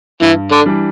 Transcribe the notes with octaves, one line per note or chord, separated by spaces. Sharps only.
G2 E3
D3
E3 G3 D4